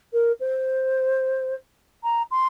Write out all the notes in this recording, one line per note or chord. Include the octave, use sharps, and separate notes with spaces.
A#4
C5
A#5
C6